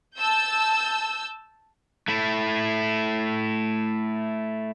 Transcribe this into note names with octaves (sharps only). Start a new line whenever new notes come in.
A5 E6 G6
A3 E4